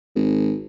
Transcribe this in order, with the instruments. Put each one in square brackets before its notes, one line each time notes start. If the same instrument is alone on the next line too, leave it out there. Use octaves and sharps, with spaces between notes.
[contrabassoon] G#1